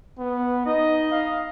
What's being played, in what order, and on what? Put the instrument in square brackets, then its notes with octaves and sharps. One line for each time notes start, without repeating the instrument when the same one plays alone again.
[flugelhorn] B3
[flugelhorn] D#4 [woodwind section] D#5
[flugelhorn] F5